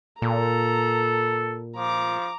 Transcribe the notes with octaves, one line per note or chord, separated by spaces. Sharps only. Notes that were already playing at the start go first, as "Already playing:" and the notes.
A#2 A4 A#5
F3 A#5 D6